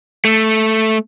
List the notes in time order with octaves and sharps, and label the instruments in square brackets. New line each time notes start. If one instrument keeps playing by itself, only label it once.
[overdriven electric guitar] A3